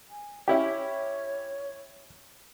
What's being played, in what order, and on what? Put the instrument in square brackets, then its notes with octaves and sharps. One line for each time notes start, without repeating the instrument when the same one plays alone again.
[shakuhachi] G#5
[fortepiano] C#4 E4 G4 [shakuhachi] C#5